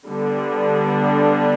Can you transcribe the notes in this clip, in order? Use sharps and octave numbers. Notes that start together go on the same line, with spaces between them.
D3 G3 B3 D4